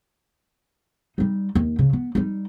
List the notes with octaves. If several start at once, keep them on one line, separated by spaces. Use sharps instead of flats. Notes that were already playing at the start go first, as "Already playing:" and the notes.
G3 D#4
D#2
C#3
B3
G3 D#4